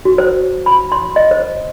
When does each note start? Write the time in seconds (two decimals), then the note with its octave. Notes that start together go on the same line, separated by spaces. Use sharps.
0.05 F#4
0.18 C5
0.66 B5
0.92 C6
1.16 D#5
1.31 C5